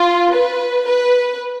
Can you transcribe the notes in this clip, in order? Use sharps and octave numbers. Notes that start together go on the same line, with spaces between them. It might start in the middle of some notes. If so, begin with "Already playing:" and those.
Already playing: F4
B4
B4